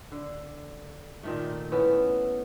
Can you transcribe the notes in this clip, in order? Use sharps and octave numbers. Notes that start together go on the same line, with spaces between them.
D3
A#2 D#3 A3
E3 B3 C#4